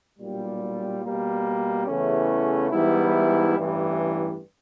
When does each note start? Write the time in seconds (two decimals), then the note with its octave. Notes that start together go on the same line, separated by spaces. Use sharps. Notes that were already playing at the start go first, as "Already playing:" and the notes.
0.18 B1 A#2 G3
1.02 B2 G3 A#3
1.86 E2 C#3 E3 A3 C#4
2.71 G#2 E3 G3 B3 E4
3.55 A1 G2 E3